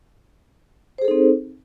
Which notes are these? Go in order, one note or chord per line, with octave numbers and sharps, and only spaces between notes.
C4 D#4 G#4 A4 C5